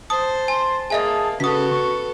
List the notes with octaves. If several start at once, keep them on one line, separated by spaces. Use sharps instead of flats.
C5 A5 D#6
G#5 C6
A#3 G#4 D#5 E5 G#5
C#3 B3 F#4 A4 D#6 B6
C#6